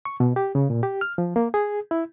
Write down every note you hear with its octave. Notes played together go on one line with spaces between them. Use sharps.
C#6
B2
G4
C#3
A#2
G4
F6
F3
A#3
G#4
E4